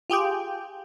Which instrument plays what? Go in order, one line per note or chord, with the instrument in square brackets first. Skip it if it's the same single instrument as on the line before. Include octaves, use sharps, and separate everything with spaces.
[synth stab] F4 G4 G#4 G5